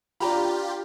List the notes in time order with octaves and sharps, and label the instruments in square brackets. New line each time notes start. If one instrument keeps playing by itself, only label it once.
[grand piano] D4 A#5 B5 [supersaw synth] F4 G4